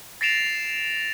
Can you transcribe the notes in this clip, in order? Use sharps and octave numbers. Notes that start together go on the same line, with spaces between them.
A6 A#6 C7 D7 E7 F7